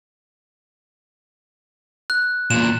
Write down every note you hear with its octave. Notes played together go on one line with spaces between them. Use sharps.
F#6
E2 A#2 E7